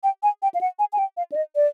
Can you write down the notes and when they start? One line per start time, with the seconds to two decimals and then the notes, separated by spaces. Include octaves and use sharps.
0.03 G5
0.23 G#5
0.42 G5
0.54 F5
0.61 F#5
0.79 G#5
0.93 G#5
0.98 G5
1.17 F5
1.32 D5
1.36 D#5
1.56 D5